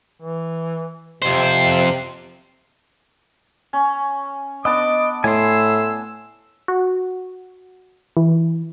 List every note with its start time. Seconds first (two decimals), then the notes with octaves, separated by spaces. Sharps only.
0.22 E3
1.22 F2 C3 C5
3.73 C#4
4.65 B3 D4 D#5 A5 D6
5.24 A2 G#5 C6 E6
6.68 F#4
8.17 E3